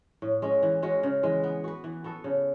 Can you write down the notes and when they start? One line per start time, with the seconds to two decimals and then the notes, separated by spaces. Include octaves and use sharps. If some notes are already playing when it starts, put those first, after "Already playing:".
0.22 A2
0.42 G#3 C#4
0.63 E3
0.83 G#3 C#4 F#4
1.03 C#3
1.23 E3 G#3
1.44 B3
1.64 F#4 B4
1.84 E3
2.04 B3 F#4 A4
2.24 C#3